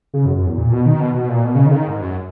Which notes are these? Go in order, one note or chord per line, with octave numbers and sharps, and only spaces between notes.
C#3
F#2
F#2
E2
A#2
B2
D#3
B2
B2
A#2
B2
C#3
D#3
C#3
D#3
G#2
F#2